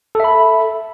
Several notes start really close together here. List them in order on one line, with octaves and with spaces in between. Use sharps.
A4 E5 B5